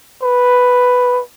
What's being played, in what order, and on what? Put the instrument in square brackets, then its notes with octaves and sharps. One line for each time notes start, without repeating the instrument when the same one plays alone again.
[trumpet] B4